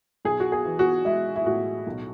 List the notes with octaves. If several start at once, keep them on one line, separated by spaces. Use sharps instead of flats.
B1 G#4
F#4
G#4
E3
F#4
G#3 E4
E4
A2 F#4
B1